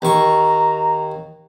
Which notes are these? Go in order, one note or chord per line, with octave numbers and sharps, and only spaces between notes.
D#2 A#5 C#6